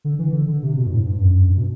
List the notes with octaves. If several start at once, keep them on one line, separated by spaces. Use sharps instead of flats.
D3
E3
D3
D3
C3
B2
G2
A2
G2
F#2
F#2
G2
B2